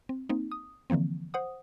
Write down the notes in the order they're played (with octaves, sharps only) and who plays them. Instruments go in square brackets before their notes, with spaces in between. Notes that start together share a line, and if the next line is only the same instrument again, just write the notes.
[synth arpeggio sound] C4
A#3 C4 D#4
D#6
D3 E3 F3 A#3 C4
C5 F#5 D#6